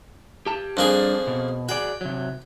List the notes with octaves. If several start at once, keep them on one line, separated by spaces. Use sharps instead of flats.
G4 A5
F2 G3 A#3 D4 G#4 D5
B2
F#4 G#4 D5 G5
C3 F#3